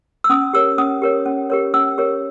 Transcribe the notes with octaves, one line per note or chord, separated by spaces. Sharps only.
E6
C#4 D#6
G4 A#4 C#5 E6
C#4 D#6
G4 A#4 C#5
C#4
G4 A#4 C#5
C#4 E6
G4 A#4 C#5